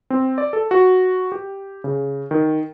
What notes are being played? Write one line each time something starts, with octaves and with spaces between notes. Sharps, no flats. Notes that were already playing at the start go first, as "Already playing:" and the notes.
C4
D5
A4
F#4
G4
C#3
D#3